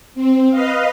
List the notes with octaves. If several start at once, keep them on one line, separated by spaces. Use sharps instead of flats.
C4
B4 D#5 F5